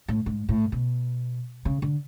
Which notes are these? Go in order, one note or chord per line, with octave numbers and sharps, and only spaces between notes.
A2
G#2
A2
B2
C#3
D3